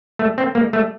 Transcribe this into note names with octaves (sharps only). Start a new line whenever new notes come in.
A3
C4
A#3
A3